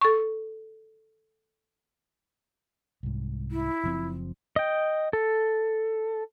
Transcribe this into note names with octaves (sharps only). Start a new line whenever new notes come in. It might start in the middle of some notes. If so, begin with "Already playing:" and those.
A4 C#6
C2 G#2
E4
F#1 F3 C4
D#5 G5
A4